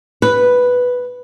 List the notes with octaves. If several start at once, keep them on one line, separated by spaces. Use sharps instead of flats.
B4